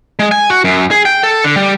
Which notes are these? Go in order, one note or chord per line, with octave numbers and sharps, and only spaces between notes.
G#3
G#5
F#4
F#2
G#4
G5
A4
D3
G3